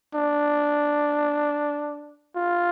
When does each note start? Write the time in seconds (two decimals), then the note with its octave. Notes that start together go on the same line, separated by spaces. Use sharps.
0.15 D4
2.36 F4